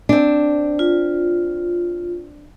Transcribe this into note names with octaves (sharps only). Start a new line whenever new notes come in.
C4 D4
F4